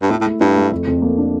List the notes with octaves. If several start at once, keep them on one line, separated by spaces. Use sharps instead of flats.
G2
A2 E4
A2
A3
G2 E4
A3
F2
F2
A#3
D4